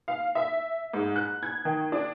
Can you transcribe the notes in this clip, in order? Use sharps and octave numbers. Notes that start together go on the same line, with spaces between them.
F5
E5
G#2
F#6
G#6
D#3
D4